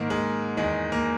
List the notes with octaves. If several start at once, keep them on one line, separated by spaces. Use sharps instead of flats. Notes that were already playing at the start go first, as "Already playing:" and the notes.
Already playing: G#2 D#3 A#3
G#3
E2 D#3 G#3
A#3